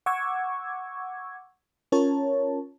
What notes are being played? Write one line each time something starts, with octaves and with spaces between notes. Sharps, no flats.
F#5 C#6 D6 E6 G#6
C#4 F4 A#4 C#5 A5